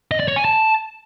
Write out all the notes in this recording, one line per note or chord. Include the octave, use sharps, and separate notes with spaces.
D#5
D5
C#5
G#5
A5